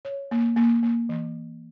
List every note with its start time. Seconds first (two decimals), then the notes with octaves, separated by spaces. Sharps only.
0.05 C#5
0.31 A#3
0.56 A#3
0.83 A#3
1.09 E3